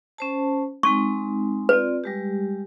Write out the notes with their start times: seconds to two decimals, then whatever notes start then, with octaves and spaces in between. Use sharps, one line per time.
0.18 C#4 C5 A5
0.83 G#3 C4 D#4 C#6
1.69 C4 F4 B4 D5
2.04 G3 G#3 G4